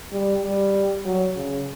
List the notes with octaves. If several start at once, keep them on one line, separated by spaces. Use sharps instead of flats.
G3
G3
F#3
C#3